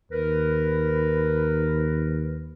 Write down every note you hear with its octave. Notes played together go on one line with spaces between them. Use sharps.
D#2 A#4 B4